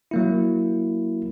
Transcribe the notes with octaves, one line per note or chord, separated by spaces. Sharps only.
F#3 A#3 E4